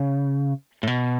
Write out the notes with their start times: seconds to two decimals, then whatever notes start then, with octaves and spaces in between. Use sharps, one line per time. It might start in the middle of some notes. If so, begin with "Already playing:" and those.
Already playing: C#3
0.83 A2
0.87 B2